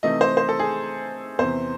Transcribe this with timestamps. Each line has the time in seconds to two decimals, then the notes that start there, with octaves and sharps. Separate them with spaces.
0.03 C3 E3 A3 D#4 D#5
0.21 C5
0.37 C5
0.49 A4
0.60 G#4
1.39 E2 C3 E3 C5